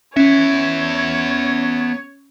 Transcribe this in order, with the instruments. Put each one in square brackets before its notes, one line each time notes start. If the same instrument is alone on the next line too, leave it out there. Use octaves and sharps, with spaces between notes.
[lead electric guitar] B3 E5 [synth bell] C#4 [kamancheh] C#5